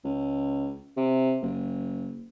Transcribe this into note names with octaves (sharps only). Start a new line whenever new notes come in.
C#2
C3
F#1